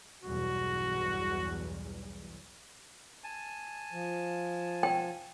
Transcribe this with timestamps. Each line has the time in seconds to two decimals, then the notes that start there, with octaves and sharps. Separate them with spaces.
0.23 B1 E2 G2 F#4
3.24 G#5 A5
3.92 F3
4.83 G5